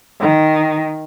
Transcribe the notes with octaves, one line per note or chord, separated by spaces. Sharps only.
D#3